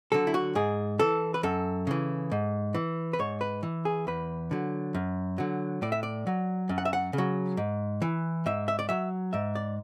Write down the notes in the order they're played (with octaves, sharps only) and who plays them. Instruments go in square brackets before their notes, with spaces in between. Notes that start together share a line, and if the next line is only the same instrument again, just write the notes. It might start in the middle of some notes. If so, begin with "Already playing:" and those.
[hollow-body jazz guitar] D3 F#3 A4
E4
F#4
G#2 G#4
E3 A4
B4
F#2 A4
C#3 E3
G#2
E3
B4
G#2 C#5
B4
E3
G#4
E2 B4
D3 F#3
F#2
D3 F#3
A2 D5
E5
D5
F#3
F#2
F#5
E5
F#5
C#3
F#3
G#2
E3
G#2 E5
E5
D5
F#3 E5
G#2 E5
D5